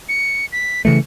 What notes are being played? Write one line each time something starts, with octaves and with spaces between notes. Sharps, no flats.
C#7
B6
C#3 E3 A3 C#7